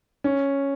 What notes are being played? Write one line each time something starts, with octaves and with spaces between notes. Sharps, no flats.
C#4